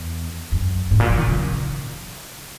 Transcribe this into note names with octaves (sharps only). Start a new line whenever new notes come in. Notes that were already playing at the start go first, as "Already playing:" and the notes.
Already playing: E2
F#2
G#2
A#2
F#3
D#3
C#3